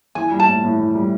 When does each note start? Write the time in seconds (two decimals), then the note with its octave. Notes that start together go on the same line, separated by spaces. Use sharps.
0.15 E3 G#5
0.31 G3
0.40 A5
0.48 A2
0.63 A2
0.79 E3
0.95 G3